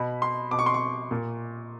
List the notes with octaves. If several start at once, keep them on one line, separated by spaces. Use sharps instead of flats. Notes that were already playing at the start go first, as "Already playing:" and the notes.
Already playing: B2 B5
C6
B2 D6
C#6
C6
C#6
A#2